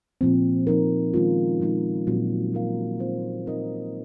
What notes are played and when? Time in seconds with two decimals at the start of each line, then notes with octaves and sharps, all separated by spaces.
0.21 A#2 F3 C4
0.67 F3 C4 D#4 A#4
1.14 D#3 G#3 C#4 F4
1.60 A#2 F3 G#3 D#4
2.07 A#2 F#3 C4
2.53 A#3 F4 A#4 F5
2.99 C4 F4 C5
3.46 C4 D#4 A#4 D#5